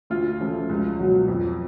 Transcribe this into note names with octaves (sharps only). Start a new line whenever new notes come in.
D2 F4
C#3 F3 A3
C#2
B2 F#3
F2